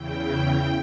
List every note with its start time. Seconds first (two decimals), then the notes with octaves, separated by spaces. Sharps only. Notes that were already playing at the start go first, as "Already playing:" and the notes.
Already playing: E2 C#3 E3 G5